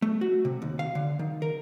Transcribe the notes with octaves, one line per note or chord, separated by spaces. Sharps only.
A3
F#4
C3
D#2
F5
D3
D#3
A#4